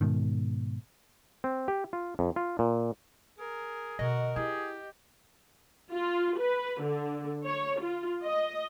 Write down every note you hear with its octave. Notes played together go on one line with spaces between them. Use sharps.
G#2 B2 D#3
C4
G4
F4
F2
F4
A#2
G#4 A#4
B2 D3 F#4 A#4 D#5
E4 G4 G#4
F4
B4
D3
C#5
F4
D#5